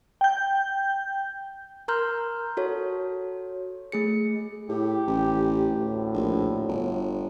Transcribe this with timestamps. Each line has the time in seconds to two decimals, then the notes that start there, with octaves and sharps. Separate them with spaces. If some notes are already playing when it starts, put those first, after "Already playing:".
0.21 G5 G6
1.88 A#4 A#5 C6 F6 G6
2.57 F#4 A4 C#5
3.92 A3 G#4 C#7
4.69 A2 G4
5.07 A1
5.69 D2 A2
6.14 A#1
6.68 G1